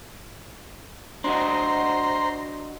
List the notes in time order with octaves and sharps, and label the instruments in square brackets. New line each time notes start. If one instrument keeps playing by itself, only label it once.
[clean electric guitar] D4 F#4 D#5 [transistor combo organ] C5 A#5 C6